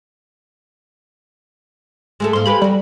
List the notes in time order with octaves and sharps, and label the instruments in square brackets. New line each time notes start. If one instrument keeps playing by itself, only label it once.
[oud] G#3 A3 A4
[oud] G#2 A#3 [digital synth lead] C6
[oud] G#3 G4 B4 [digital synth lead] B5
[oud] F#3 A#4 [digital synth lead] G3